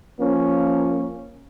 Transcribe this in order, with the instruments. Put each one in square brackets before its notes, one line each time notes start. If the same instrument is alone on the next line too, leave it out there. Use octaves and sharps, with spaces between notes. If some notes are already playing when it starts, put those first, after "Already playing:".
[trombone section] F3 A#3 C#4